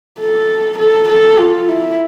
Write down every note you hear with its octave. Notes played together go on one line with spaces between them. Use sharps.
A4
A4
A4
F4
E4